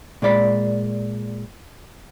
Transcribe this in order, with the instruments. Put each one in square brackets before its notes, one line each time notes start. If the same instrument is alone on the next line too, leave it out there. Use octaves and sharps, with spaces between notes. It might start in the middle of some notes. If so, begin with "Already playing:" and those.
[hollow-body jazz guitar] A#2 G#3 D5 B5